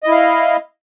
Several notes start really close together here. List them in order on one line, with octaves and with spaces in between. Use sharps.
D#5 E4 F5